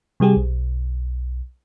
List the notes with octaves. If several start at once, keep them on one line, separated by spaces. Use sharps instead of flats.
C3 G3 G4 G#4
B1